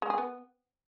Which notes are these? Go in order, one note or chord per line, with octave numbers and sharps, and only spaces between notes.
G#3
G#4
B3